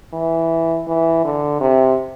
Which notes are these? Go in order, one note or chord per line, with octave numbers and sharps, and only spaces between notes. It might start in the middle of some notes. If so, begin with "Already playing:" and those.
E3
E3
D3
C3